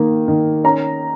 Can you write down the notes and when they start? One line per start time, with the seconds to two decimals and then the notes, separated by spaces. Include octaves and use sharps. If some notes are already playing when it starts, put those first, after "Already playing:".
Already playing: D#3 A#3
0.28 D#3
0.64 C#4 A#5